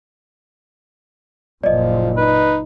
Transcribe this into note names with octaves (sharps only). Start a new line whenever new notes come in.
F#1 A#2 F3 D5 D#5
D#4 B4